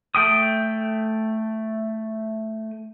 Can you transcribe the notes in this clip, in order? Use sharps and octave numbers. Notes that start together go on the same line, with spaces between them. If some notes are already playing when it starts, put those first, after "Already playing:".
A3 G5 D#6